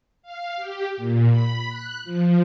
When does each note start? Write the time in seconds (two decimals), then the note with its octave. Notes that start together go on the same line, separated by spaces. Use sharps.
0.22 F5
0.56 G4
0.97 A#2
1.29 B5
1.69 F#6
2.04 F3